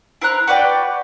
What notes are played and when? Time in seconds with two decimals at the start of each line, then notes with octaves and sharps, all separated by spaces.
0.22 E4 C5 A#5 F#6
0.47 F#4 B4 D5 G5